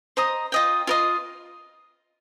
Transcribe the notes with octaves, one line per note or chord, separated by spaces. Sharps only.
C5 D#5 A#5 D#6
F4 D#5 G5
F4 A#4 D#5 C6